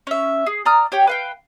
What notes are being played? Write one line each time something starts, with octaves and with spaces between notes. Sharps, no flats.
C#4 E5
G#4
D5 A#5 D#6 F6
G4 C#5 G5
B4 F5 G5